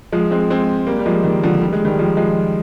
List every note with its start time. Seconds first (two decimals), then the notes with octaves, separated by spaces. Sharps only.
0.12 F3 G#3
0.31 G#3 C4
0.50 G#3 C4
0.87 G3 A#3
0.99 G3
1.06 F3 G#3
1.24 D#3
1.43 D3 F3
1.61 G3
1.73 G#3
1.85 D#3 G3
1.99 F3 G#3
2.17 F3 G#3